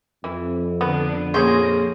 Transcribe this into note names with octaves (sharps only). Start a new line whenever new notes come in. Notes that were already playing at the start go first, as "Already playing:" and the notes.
F2 E3
D3 B3 D4
A#1 A#3 C#4 G#4 C5 C#5 C6 A#6